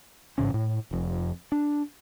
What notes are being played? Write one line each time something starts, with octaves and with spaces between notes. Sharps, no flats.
A1 G#2 C#3 C#4
A2
F1 F2
D4